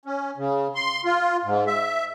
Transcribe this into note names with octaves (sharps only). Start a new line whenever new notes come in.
C#4
C#3
C6
F4
G#2
E5